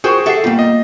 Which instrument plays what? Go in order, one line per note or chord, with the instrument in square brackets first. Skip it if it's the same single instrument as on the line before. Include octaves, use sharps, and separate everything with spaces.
[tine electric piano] F4 A#4 [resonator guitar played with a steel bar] F#4 C5 [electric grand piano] G#4 G5
[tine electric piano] G4 F#5 C7 [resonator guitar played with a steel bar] A4 E5
[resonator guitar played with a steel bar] A#2 G3 [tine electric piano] A#3 B3 F4
[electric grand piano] D#5